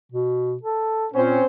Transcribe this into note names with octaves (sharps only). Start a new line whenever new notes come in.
B2
A4
A#2 C4 C#4 C5